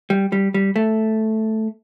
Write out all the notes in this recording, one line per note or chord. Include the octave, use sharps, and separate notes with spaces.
G3
G3
G3
A3